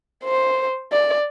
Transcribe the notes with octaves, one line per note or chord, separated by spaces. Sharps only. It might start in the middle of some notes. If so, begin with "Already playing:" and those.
C5
D5